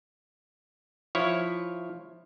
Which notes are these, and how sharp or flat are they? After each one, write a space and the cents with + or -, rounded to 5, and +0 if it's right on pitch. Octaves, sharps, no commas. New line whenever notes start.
F3 +0 E4 +0 C#5 +0